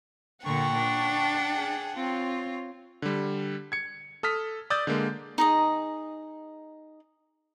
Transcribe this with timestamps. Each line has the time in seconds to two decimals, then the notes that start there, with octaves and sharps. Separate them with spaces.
0.44 A#2 D3 F#5 G5 A5 A#5 C#6
0.76 D4
1.53 G#4
1.96 C4 F4 C#5
3.02 D3 G3
3.72 G#6 C#7
4.23 A4 D#6 F6 B6
4.70 D5 D#6 E6 G6 A6
4.87 D3 G#3 A#3
5.38 D#4 G#4 D#5